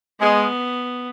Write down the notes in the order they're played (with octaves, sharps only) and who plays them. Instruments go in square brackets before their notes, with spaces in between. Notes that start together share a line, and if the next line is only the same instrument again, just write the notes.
[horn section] G#3 [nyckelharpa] B3